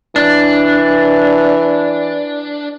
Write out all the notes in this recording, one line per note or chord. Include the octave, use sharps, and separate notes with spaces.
E3 D4